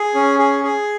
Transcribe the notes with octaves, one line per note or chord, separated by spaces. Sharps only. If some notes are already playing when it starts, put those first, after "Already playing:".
Already playing: G#4
C#4
G#4
G#4